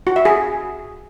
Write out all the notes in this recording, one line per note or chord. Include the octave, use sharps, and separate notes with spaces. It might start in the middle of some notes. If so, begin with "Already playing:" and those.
F#4
E5
G#4